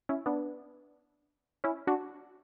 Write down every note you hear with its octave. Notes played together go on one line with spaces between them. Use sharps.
C#4 E4
B3 D4
C#4 E4
D4 F#4